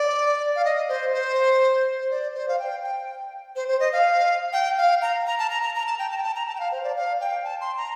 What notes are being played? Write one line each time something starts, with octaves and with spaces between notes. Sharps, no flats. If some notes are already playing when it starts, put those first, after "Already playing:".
Already playing: D5
F5
D#5
C5
C5
C5
D5
C5
F5
G5
G5
C5
C5
D#5
F5
G5
F5
A#5
A#5
A5
A#5
A#5
A#5
A5
G5
A5
G5
A5
A#5
A5
G5
F5
C5
D5
F5
G5
A5
C6
A#5